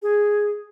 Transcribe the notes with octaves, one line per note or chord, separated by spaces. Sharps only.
G#4